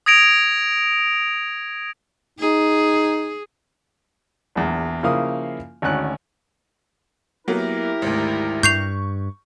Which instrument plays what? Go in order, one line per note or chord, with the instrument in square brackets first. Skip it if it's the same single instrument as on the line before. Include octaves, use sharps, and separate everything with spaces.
[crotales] D#6 G#6 A#6 D7 F7
[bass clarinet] D#4 [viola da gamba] G#4
[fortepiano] A#1 E2
C#3 F3 A#3 E4 F5 D#6
G#1 D2 C#4 F#6
[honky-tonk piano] F#3 A#3 B3 [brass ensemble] E4 G4 A#4
[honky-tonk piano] G#1 D2
[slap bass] G2 [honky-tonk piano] C#6 [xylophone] G6 C7 F7